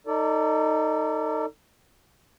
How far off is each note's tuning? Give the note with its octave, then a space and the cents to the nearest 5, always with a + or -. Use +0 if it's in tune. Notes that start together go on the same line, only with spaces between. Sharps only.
D#4 +0 A4 +35 D5 -15